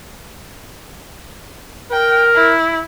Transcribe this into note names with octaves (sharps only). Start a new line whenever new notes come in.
A#4 G5
E4